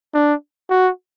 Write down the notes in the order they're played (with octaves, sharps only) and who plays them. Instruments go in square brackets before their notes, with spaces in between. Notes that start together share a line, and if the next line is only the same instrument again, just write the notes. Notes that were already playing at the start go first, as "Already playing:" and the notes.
[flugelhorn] D4
F#4